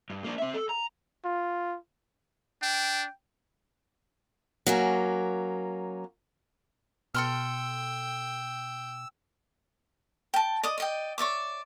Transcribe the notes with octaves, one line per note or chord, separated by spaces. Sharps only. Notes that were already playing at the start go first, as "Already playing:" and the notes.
G2
A#3 D4
C4 E5
A4
A#5
F4
D4 G5
F#3 A#3 C#4
B2 A4 G5 C6 E6 F6
G5 A5
D5 D#5 D#6
D5 D#5 G5
C#5 D5 E5 D6